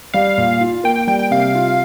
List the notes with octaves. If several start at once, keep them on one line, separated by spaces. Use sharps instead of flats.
G3 F5
A#2
F4
A#3 G5
G5
G3 G5
G5
C3 F5
F4